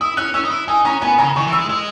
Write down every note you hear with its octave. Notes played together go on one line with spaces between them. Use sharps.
E4 D#6
C#4 F#6
C#4 E6
D#4
E4
D#4 G#5
C#4 A#5
B3 G#5
C#3 A#5
D#3 C#6
E3
E6
G#3
G#3 E6